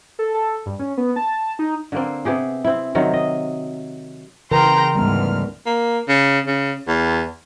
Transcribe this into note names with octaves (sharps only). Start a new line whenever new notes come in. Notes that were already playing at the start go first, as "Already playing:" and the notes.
A4
A4
G2
C#4
B3
A5
D#4
D3 A#3 C4
C3 B3 G4 G#4
C4 E4
C3 D#3 F#3 C4
D#5
C#3 E3 A#4 G5 A#5 C6
D2 G#2 G3 B3 F6
A#3
C#3
C#3
E2